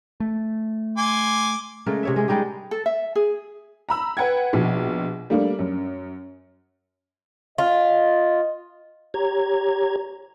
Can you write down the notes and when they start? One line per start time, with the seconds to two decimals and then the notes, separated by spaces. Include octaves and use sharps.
0.20 A3
0.98 G#5 C6 D6
1.86 C#3 G#3 A3 A#4
2.03 C3 C#5 E5
2.16 G#3 C#4 G#4
2.28 G3 G#3 D#4 G4
2.71 A4
2.86 E5
3.16 G#4
3.89 A#5 B5 E6
4.17 B4 F#5 G5 G#6
4.53 A#1 B2
5.30 G3 A3 A#3 D4
5.59 F#2
7.58 F4 D#5
9.14 G4 C#5 A#5 G#6